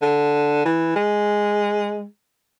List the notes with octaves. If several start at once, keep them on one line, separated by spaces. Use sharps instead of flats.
D3
E3
G#3